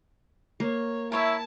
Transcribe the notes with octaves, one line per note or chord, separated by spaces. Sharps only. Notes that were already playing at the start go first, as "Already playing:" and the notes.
A#3 C#5
E4 A#4 C#5 E5 A5